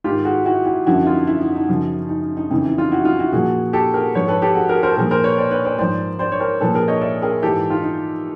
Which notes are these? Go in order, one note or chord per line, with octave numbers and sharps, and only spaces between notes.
G#2 D#3 F4 G4
F#4 G#4
E4 F#4
E4 F#4
F#2 D3 F3 E4 F#4
D#4 F4
E4
D#4
D#4
F#2 C#3 F3
D#4
D#4
F2 C#3 E3 D#4
E4
D#4 F4
E4 F#4
D#4 F4
E4 F#4
A#2 F3 F#4 G#4
G4 A4
G#4 A#4
G#2 F3 B4 C#5
A4 B4
G4 A4
F#4 G#4
G#4 A#4
A#4 C5
A4
A#2 F3 G#4 A#4
A#4 C5
B4 C#5
C5 D5
B4 C#5
C5 D5
G#2 F3 C5 D5
C5 D5
C#5
A#4 C5
A#2 F3 A4 B4
G#4 A#4
C#5 D#5
D5 E5
G#4 A#4
G#2 E3 G4 A4
D#4 F4
D#4